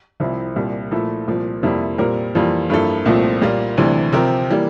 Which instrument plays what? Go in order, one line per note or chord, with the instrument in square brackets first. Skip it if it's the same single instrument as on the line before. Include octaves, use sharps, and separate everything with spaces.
[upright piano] C2 C3 F3 C4 E4
C2 A#2 G3
A#2 F3 A3 E4 A4
C2 A#2 F3
F2 C3 G3 A#3 E4
A#2 G3 C4 G4 A#4
F2 E3 G3 A#3 F4
G2 F3 A#3 E4 A4
C2 A#2 F3 A3 C4
A#2 G3 A#3 F4
D2 C3 E3 G3
C3 F3 C4 G4 A#4
E3 G3 A#3